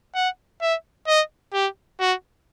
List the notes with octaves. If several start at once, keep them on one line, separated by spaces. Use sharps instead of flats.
F#5
E5
D#5
G4
F#4